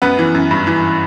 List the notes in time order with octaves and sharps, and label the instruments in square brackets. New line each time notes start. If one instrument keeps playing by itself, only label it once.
[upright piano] F#2 B3 B4
E3
F#2
G2
E3